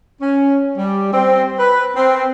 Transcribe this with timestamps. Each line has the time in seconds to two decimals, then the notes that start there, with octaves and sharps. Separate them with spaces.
0.21 C#4
0.77 G3
1.13 C4
1.59 B4
1.96 C4